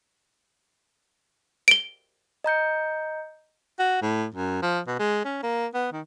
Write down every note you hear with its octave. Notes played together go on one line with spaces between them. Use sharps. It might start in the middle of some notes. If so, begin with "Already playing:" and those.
D7 G7
D#5 A#5 G6 C#7
F#4
A2
F#2
F3
B2
G#3
C#4
A#3
B3
D#3